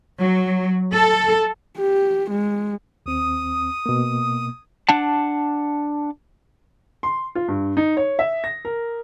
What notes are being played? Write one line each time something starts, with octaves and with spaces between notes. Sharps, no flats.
F#3
A4
G4
G#3
D#2 C4 D#6
B2 A#3
D4 F#5 A5
C6
F4
G2
D#4
C#5
E5
A#6
A#4